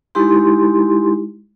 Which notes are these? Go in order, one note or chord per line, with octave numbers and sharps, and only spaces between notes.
G#3 D#4 E4 G4 C6